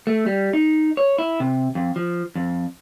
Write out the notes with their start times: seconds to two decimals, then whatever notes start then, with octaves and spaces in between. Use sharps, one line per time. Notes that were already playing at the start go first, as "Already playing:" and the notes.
0.07 A3
0.26 G3
0.53 D#4
0.97 C#5
1.18 E4
1.40 C3
1.75 F2
1.96 F3
2.35 F2